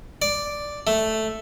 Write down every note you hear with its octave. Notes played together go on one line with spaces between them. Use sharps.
D5
A3